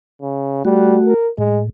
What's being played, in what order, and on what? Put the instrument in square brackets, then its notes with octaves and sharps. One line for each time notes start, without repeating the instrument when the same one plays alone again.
[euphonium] C#3
[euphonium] G3 [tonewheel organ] A3 F#4
[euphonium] A#4
[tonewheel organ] A2 [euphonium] G#3